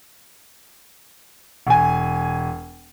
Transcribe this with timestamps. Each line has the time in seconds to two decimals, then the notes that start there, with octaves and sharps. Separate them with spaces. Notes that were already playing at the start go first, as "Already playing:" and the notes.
1.67 E1 G#5